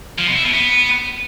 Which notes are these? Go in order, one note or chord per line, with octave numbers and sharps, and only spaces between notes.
F3
B2
E4
B2
B3